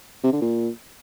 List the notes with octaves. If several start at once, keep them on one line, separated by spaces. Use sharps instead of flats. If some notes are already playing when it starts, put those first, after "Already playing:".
C3
D3
A#2